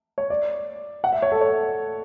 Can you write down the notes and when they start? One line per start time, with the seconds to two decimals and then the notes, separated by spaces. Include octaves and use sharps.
0.18 C#5
0.30 D5
1.04 F#5
1.13 E5
1.22 C#5
1.32 A4
1.41 C#5